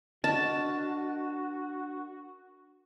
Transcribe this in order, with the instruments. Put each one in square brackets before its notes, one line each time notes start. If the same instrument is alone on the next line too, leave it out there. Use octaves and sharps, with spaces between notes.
[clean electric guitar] D4 A#4 D#5 [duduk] F#4 [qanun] A5